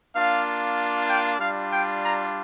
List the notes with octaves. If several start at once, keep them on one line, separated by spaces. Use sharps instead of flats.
A#3 D4 F4 F5
G5
G3 D4 F4 F5
G5
A#5